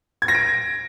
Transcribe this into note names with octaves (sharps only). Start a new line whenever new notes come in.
G#6
A#6
D7